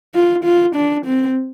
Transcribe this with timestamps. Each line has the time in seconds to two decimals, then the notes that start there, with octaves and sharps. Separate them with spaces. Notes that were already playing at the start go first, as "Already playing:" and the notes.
0.15 F4
0.44 F4
0.76 D4
1.06 C4